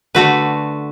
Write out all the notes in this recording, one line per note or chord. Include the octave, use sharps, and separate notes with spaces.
D3 A3 F#4 B4